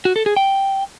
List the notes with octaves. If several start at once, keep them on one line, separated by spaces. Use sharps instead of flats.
F#4
A4
G#4
G5